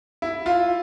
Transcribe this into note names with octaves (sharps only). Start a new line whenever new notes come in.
E4
F4